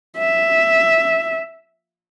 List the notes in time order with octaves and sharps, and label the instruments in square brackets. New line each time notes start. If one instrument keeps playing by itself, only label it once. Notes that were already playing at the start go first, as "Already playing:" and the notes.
[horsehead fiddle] E5